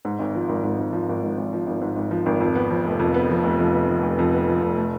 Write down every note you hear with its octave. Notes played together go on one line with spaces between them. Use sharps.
G#2
G#1
F3
G#1
G#2
G#1
F3
G#1
G#2
G#1
F3
G#1
G#2
G#1
F3
G#1
F2
B3
F3
F1
F2
B3
F3
F1
F2
B3
F3
F1
F2
B3
F3
F1
A3